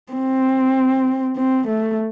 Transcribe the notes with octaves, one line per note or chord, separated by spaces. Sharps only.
C4
C4
A3